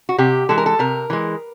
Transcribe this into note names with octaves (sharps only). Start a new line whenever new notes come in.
F#4
C3 G4
E3 G#3 A4
A#4
A4
C3 A#4
E3 G#3